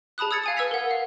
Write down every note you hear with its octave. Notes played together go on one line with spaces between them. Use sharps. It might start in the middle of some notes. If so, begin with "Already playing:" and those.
G#4 A5 B5 D#6 F#6
D#6 E6 G#6 A6 C#7
F5 G#5 D#6
B4 E6 G#6 B6 F7
A#4 F#5
F5